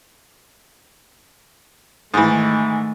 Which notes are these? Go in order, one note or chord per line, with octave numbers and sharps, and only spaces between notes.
G#2 D#3 E3 A3